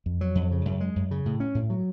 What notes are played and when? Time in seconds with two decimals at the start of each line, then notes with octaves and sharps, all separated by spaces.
0.06 F2
0.21 F#3
0.35 F2
0.51 C#3
0.65 F#2
0.81 G#3
0.96 F#2
1.11 C#3
1.26 A2
1.40 C#4
1.55 A2
1.70 F#3